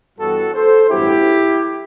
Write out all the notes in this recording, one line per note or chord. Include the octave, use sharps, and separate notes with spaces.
G2 E3 G3 B3 F#4 A4
A4 C5
A1 G2 F#3 B3 E4 G4